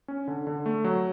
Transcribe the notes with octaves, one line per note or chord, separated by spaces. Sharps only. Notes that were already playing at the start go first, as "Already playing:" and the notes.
C#4
D3
D3
A3
F#3